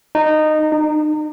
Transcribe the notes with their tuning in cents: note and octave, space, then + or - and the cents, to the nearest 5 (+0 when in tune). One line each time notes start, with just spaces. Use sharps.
D#4 -15
D#4 -40